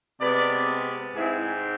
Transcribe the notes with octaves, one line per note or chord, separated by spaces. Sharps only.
C3 G#3 B3 B4 D5
G#2 G#3 C4 E4 G#4